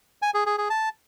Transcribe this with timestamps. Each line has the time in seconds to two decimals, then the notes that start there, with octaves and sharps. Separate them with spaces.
0.22 G#5
0.34 G#4
0.46 G#4
0.58 G#4
0.70 A5